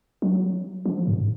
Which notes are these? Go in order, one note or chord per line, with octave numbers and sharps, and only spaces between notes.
F#3
F3
G#2